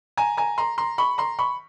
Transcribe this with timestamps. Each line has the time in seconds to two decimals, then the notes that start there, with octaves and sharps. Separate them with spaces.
0.17 G#5 A#5
0.37 G#5 A#5
0.58 A#5 C6
0.78 A#5 C6
0.98 B5 C#6
1.18 A#5 C6
1.39 B5 C#6